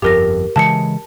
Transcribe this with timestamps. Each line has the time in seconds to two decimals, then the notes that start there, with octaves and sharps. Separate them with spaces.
0.02 G1 F2 G4 A#4 A#6
0.56 C#3 E3 G#3 A5 C#7